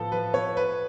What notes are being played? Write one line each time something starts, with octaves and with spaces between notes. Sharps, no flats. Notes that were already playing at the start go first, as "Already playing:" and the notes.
Already playing: A2 F3 B3 A4
F3 B4
B3 C#5
B3 B4